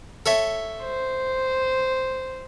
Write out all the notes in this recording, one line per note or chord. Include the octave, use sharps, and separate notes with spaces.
A4 C#5 E5
C5